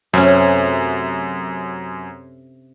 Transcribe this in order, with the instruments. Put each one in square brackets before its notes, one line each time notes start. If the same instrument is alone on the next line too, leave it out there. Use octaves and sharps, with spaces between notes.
[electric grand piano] F#2 [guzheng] C3 A3 C#4